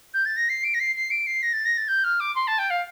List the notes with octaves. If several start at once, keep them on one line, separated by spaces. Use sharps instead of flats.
G6
A6
A#6
C7
D7
A#6
C7
C7
D7
C7
A#6
A6
A#6
A6
G6
F6
D6
C6
A5
G5
F5